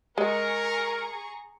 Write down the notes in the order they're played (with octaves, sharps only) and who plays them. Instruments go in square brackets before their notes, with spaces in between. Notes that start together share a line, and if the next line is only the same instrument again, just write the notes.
[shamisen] G#3 [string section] G#4 A#5 C#6 [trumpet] A#4